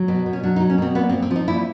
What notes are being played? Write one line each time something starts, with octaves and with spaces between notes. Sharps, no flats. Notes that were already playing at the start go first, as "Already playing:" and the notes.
Already playing: F#3
B2
B2
C#4
F#3 D4
D#4
F#3
C#4
B2 C4
A#2 B3
C4
F3
C4
F3
D#4
A#2 E4